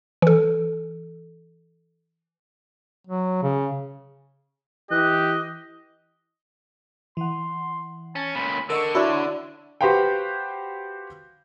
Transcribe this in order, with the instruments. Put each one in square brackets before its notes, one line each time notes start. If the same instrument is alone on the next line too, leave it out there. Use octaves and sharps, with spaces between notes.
[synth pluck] E3 A4
[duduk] F#3
C#3
[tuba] E3 [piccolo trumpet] G4 [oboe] D#5 [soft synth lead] F#6
[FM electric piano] E3 F#5 [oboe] C6
[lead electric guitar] C#4 [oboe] A5
[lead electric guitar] C#2 A#2 [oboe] B5
[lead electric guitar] D3 [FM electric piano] A#4 D#5 C#6 [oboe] E6
[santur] D4 E4 [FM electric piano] F#4 [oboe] C#5
[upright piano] F#4 G4 B4 C5 F5 G5